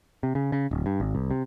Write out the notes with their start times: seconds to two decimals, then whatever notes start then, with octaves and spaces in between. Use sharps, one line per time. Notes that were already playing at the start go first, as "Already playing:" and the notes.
0.23 C3
0.35 C#3
0.52 C#3
0.71 D1
0.86 G2
1.00 G#1
1.15 C2
1.31 C3